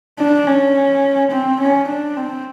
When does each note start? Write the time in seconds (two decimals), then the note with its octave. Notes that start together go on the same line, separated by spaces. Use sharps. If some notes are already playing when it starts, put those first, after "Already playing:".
0.19 D4
0.47 C#4
1.31 C4
1.60 C#4
1.88 D4
2.17 C4